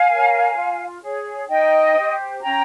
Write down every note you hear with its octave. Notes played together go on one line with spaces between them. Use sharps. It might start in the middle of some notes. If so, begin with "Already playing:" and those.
Already playing: F5 G#5
A#4 C#5
F4
G#4 C#5
D#4 D#5 G5
G4 C5
C#4 G5 A#5